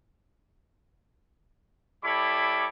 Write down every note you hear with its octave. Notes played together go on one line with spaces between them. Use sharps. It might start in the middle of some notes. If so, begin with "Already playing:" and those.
G3 E4 A4 C#5 B5 D6